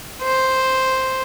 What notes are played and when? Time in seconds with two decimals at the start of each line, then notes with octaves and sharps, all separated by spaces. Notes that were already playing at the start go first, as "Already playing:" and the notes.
0.23 C5